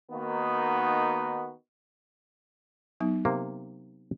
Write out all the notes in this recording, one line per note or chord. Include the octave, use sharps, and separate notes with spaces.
D#3 A#3 B3 D#4 F#4
F#3 B3 D#4
C3 A#3